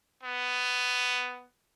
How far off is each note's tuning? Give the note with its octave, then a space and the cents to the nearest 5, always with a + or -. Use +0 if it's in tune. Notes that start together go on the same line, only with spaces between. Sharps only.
B3 +10